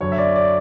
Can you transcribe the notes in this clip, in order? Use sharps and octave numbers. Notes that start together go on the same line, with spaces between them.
F#2 D3 F#3 C#5
E5
D5
D5